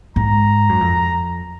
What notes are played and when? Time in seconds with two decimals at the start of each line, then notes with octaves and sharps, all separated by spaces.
0.16 G#2 A#5
0.69 F#2
0.81 F2